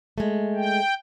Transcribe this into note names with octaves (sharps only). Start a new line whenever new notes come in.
G#3 A3
G5